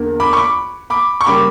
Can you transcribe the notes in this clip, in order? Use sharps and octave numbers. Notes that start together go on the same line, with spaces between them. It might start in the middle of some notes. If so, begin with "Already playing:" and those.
Already playing: E2 D3 A#3
B5 D6
C#6
B5 D6
B5 D6
C#6
C#3 G3 A#3 B5 D6